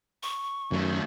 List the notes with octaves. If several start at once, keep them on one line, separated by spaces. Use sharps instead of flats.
C#6
F#2 D#3 A3